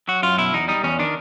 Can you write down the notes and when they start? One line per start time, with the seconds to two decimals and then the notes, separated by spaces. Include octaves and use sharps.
0.08 F#3 F#4
0.23 F#2 F4
0.38 B2 E4
0.53 E2 D#4
0.68 G3 D#4
0.83 E2 C#4
0.99 D#3 D4